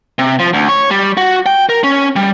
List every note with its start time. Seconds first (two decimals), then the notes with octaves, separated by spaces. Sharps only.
0.19 C3
0.39 F3
0.54 D2
0.69 C#5
0.91 G3
1.17 F#4
1.46 G5
1.69 A#4
1.84 C#4
2.16 G3